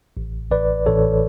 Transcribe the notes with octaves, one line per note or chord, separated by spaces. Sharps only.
A1
A1 B4 D5
A1 A4 C#5